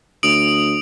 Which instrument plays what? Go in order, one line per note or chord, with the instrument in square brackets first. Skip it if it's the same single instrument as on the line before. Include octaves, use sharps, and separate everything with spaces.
[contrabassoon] D2 [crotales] D#6 D7 F#7